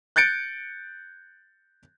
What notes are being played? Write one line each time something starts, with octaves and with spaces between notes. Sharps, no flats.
F#6 G6 A6 C#7 D7